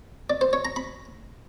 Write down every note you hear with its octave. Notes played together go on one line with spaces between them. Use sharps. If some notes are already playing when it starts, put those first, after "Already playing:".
D5
C5
C#5
A#5
B5